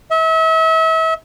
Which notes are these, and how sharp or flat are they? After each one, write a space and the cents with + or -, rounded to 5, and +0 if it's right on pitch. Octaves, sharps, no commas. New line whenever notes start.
E5 -35